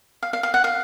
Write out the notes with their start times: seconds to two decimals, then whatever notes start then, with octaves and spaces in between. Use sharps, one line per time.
0.23 F5
0.33 F5
0.43 F5
0.54 F#5
0.64 F5